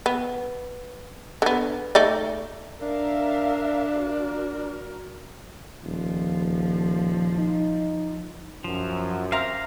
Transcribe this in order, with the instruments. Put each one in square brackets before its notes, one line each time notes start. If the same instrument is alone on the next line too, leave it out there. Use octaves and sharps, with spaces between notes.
[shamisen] B3
D3 B3
A3 D#4 D5
[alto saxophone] D4 [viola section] A#4 E5 F5
[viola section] F#4 A#4
[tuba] D#1 [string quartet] F3
[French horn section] D#4
[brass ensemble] F#2 [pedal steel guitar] F3
[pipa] A#3 C4 A#4 [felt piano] E5 [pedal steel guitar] F5 A#5